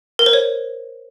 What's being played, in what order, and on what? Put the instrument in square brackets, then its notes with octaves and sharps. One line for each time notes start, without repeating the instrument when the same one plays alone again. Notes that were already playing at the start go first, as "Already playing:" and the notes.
[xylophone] A#4
C5
C#5